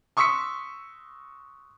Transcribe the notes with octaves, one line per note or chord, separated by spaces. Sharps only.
C6 C#6 D#6 E6 B6 C#7